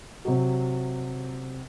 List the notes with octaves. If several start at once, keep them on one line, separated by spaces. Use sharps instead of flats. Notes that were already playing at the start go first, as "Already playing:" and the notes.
C3 F#3